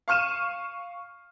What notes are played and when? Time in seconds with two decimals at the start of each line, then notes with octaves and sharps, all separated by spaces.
0.08 F5 C#6 F6 D#7 E7